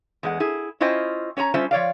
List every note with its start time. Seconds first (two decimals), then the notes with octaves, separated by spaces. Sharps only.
0.23 E2 G#3 F#5
0.40 E4 G#4
0.80 C#4 E4 F4 C5 D#5 G5
1.37 C#4 C#5 G#5 A#5
1.54 G3 C#4 F4 C5 E5
1.71 F3 C#5 D5 F5